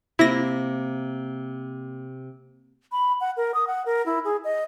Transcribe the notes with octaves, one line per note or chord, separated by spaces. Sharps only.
C3 A#3 E4 A#6
B5
F#5
A#4
D#6
F#5
A#4
E4
G#4
D#5